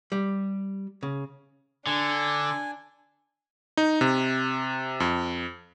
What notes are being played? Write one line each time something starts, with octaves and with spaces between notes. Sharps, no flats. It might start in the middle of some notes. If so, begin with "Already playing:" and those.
G3
C#3
D3 D4 G#5
D#4
C3
F2